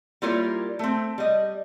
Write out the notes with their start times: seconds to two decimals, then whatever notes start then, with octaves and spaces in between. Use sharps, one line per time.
0.22 G3 A#3 E4 F4 A#4 C#5
0.79 A3 C4
1.18 G3 D#5